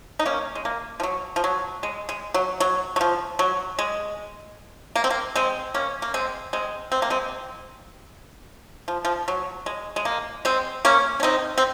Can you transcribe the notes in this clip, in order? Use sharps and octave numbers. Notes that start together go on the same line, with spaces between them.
D#4
A#3 C#4
G#3
A#3
F3
F#3
F3
F#3
G#3
G#3
F#3
F#3
F#3
F3
F#3
G#3
A#3
C4
A#3
G#3 C4
A#3 C#4
A#3
G#3 C4
G#3 C4
C4
A#3
G#3 C4
F3
F3
F#3
G#3
G#3
A#3
G#3 C4
A#3 C#4
C#4
C4 D#4
C4